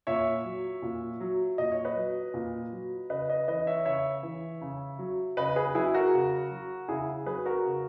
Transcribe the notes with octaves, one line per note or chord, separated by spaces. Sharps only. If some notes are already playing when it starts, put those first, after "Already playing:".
A#2 C#5 E5
F#3
A#2
F#3
A#2 D#5
C#5
B4 D#5
F#3
A#2
F#3
C#3 B4 D#5
B4 D#5
E3 B4 D#5
C#5 E5
C#3 C#5 E5
E3
C#3
F#3
C#3 B4 D#5
G#4 B4
F#3 E4 G#4
F#4 A#4
C#3
F#3
C#3 E4 G#4
F#3 G#4 B4
F#4 A#4
C#3